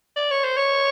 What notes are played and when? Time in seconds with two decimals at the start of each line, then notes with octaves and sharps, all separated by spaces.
0.16 D5
0.31 C#5
0.44 C5
0.57 C#5